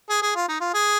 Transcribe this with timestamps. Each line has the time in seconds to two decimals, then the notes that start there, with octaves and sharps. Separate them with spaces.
0.10 G#4
0.22 G#4
0.35 F4
0.48 D#4
0.60 F4
0.74 G#4